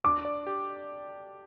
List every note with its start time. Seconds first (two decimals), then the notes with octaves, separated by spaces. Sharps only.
0.04 D4 D6
0.25 D5
0.47 G4